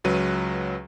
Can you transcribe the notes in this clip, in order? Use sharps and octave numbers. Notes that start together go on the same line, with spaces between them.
C#2 F#3 B4 D#7